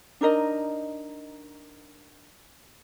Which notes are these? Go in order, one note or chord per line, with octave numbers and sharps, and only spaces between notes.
D4 D#4 A#4 D#5